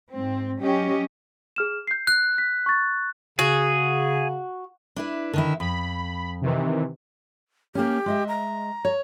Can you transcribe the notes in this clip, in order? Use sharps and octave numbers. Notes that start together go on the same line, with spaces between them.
G#2 C4
F#3 C#4 G4 D#5
G#4 F6 E7
G6 C7
F#6
B6
C#6 A6
C#3 F#4 G#4
D4 E4 B4
D3 D#3 E4
F2 B5
C3 D#3 E3
A#3 C#4 G4
G#3 D#5 E5
A#5
C#5